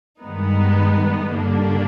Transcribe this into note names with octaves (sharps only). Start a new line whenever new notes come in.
G2 D#3 G#3 B3 D#4
G2 D3 G3 A#3 D4